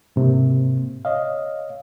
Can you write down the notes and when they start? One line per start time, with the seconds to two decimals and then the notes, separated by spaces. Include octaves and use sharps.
0.16 G#2 C3 A#3
1.05 C#5 D#5 F5